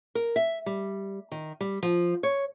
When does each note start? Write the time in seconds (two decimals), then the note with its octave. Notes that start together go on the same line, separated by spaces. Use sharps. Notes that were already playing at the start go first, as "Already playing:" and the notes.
0.15 A#4
0.36 E5
0.66 G3
1.31 D#3
1.61 G3
1.83 F3
2.23 C#5